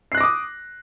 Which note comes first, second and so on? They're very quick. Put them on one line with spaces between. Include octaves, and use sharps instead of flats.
C7 F#6 A#6 D6 D#6